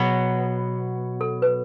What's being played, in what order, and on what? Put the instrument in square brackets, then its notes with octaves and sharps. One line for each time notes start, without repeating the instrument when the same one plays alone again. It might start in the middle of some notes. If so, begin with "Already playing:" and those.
Already playing: [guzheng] B2 F#3 B3 [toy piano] G#4
[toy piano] A4
B4